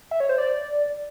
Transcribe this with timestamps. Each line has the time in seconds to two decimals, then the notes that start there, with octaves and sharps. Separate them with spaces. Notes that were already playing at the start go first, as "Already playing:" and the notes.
0.11 E5
0.20 C#5
0.29 C5
0.38 D5